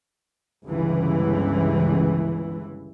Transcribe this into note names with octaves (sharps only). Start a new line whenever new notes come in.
G1 C#2 E3